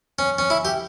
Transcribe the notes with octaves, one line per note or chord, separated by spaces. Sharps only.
C#4
C#4
E4
G4